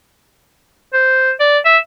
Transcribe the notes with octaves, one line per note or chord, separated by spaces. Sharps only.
C5
D5
E5